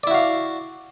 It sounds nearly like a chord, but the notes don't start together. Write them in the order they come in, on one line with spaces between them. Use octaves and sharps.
D5 E4 F#4 F5